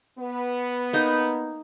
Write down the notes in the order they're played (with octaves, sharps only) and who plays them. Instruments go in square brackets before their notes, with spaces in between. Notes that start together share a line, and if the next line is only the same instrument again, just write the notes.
[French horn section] B3
[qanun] A#3 D#4